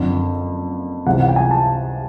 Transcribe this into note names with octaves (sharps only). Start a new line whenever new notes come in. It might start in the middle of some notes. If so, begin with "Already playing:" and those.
Already playing: F#1 F2 D3
C#2 C3 E3 G3 F#5
F#5
G5
G#5
A5